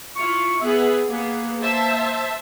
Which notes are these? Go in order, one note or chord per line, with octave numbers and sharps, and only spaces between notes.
E4 F4 C#6
B3 G#4 E5
A#3 B3 G#4
C5 E5 A5